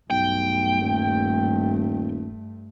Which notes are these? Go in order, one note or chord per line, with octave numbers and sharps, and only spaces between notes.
B1 G2 A3 G5
D#1